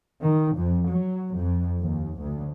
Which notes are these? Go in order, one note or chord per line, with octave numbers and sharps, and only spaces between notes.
D#3
F2
F#3
F2
D#2
D2